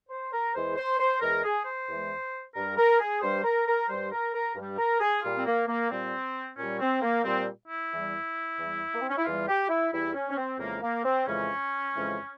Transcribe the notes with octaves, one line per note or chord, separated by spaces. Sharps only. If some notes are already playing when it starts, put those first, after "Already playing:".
C5
A#4
E2 E3 G#3 C5
C5
C5
E2 E3 G#3 A#4
G#4
C5
E2 E3 G#3
G2 G3 A#4
A#4
G#4
G2 G3 C5
A#4
A#4
G2 G3 C5
A#4
A#4
G2 G3
A#4
G#4
A#2 G3 F4
C4
A#3
A#3
A#2 G3 C4
A#2 G3 C#4
C4
A#3
A#2 G3 C4
E4
E2 E3 G3
E2 E3 G3
A#3
C4
C#4
E4
E2 E3 G3 F4
G4
E4
E2 E3 G3 E4
C#4
C#4
C4
F2 C#3 E3 G#3 A#3
A#3
C4
F2 C#3 E3 G#3 C#4
F2 C#3 E3 G#3